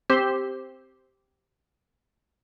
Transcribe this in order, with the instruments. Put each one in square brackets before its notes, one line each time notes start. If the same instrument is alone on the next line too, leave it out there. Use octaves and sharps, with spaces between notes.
[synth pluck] C4 G4 C5